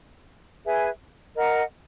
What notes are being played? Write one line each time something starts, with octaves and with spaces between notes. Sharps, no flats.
G#4 B4 E5 G#5
A#4 D#5 F#5 A#5